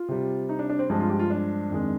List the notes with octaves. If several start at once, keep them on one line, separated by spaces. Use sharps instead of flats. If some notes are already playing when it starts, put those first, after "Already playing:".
Already playing: F4
C3 G3
D#4
D4
D4
C4
G2 F3 G#3 C4
F4
G4
F4
D4
F2 D#3 G#3